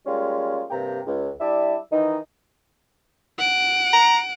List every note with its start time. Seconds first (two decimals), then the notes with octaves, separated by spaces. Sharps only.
0.06 G3 G#3 A#3 C#4 F4
0.70 G2 C3 A#3 G5 A#5
1.07 C#2
1.39 G3 D4 E4 D5 E5
1.91 D#3 E3 D#4
3.38 F#5 D7
3.93 A#5